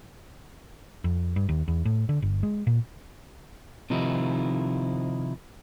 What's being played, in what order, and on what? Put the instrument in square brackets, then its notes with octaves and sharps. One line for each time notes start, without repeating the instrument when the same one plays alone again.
[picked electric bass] F2
G2
D#2
E2
A2
D3
G1
G#3
A#2
[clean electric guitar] C3 D#3 F3 D#4 E4